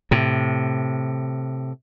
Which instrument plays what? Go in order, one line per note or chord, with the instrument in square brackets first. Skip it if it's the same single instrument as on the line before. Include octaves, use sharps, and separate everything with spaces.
[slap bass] A2 C3